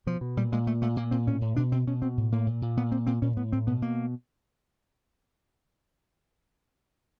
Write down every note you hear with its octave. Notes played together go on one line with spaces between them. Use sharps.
B2 F3
B2
A#2 G3
A#2 G#3
A#2 A3
A#2 A3
A#2 A#3
A#2 C4
A2 C#4
A2
B2 D4
B2 C4
B2 C#4
B2 C4
A2
A2 A#3
A#2
A#2
A#2 B3
A#2 C4
A#2 C4
A#2 C#4
A2 B3
A2 C4
B2 B3
B2 A#3